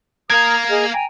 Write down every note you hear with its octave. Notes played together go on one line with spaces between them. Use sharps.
A#3 A#4 F5 D#6 G#6
G#4 D#5 F6
G5 G#5 A#5